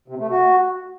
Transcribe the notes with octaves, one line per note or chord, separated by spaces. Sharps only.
C3
A3
F#4